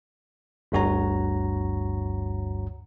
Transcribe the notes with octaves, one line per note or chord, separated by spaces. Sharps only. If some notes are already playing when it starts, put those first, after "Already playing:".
G1 D2 G2 F#4 C#5 A#5